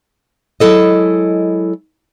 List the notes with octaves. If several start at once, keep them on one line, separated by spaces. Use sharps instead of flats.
F#3 G#3 E4 A4 D#5